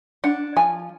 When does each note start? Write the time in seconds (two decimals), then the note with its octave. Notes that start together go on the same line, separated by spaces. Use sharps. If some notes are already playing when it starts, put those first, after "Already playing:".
0.24 D4 F#5
0.57 F3 G#5